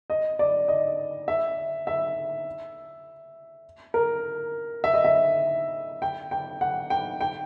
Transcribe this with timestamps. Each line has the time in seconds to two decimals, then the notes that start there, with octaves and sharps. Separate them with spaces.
0.10 D#5
0.39 D5
0.68 D#5
1.28 E5
1.87 E5
3.94 A#4
4.84 E5
4.94 D#5
5.05 E5
6.02 G5
6.31 G5
6.61 F#5
6.90 G5
7.21 G5